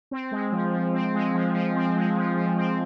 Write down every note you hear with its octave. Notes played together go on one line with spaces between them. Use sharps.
C4
G#3
F3
F3
C4
G#3
F3
F3
C4
G#3
F3
F3
C4